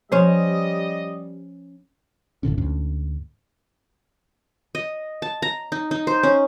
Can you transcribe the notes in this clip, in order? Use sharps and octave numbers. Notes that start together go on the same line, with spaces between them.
F3 G3 C#4 C5 D#5
E1 A2 D3 C#4
D2 G#2 C#4
D#5
A5
A#5
D#4
D#4
C5
C#4